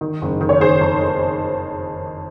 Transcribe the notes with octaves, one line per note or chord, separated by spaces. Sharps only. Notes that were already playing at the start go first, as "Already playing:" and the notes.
D#3
F#1
D#3
C#5
D#3 G#4 C5
F2